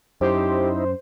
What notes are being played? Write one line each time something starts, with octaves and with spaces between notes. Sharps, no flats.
F#2 D#4 E4 G4 C5